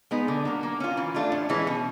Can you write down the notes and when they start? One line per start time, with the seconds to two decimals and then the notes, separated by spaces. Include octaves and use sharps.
0.11 G#3 B3 D#4
0.28 D3
0.45 F#3 A#3
0.63 A#3
0.80 C#4 F4
0.97 E3
1.15 A3 D4 F4
1.32 A2
1.49 E3 G#3 C#4
1.67 B2